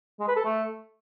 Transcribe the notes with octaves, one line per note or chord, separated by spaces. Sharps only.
G#3
B4
A4
A3